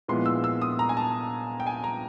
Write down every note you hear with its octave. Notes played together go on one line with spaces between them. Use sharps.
A#2 F3 G#3 B3 E4 C6
E6
E6
D#6
A#5
G#5
A5
G5
G#5
A#5